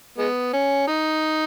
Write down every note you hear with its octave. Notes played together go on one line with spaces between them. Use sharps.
G#3 B3
C#4
D#4